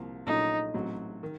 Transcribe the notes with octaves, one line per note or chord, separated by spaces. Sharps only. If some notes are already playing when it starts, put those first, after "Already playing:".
Already playing: C2 C3 F3 A#3
A#1 A#2 F#3 A3 C#4 D#4
A1 A2 F#3 C4 F#4
D#3